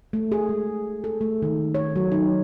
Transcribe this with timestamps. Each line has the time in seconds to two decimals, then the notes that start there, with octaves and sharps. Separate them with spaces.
0.13 A3
0.32 G#4
0.49 G#3
1.04 A4
1.21 A3
1.42 D#3
1.74 C#5
1.96 F#3
2.12 D#4